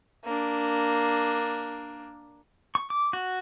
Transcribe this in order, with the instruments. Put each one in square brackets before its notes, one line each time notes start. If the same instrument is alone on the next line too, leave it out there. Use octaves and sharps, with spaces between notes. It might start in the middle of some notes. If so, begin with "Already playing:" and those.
[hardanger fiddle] A#3 D4
[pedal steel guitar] C#6
D6
F#4